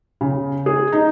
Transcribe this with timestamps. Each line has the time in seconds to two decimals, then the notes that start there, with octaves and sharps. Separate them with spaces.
0.21 C#3
0.66 G#4
0.92 D#4